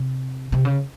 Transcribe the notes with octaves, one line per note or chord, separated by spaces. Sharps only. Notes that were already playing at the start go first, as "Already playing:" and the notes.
Already playing: C3
C3
C#3